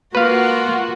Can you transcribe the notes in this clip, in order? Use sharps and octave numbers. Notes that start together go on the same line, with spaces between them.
A#3 F4 F#4 B4 F5